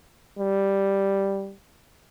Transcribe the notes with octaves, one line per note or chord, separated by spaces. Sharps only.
G3